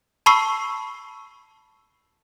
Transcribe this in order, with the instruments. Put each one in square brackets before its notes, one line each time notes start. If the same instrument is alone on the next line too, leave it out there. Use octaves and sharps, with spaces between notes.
[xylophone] A5 B5 C#6 E6 C7